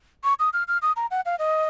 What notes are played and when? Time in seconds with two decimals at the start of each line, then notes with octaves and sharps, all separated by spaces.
0.24 C#6
0.39 D#6
0.53 F6
0.68 F6
0.82 D#6
0.96 A#5
1.11 F#5
1.26 F5
1.39 D#5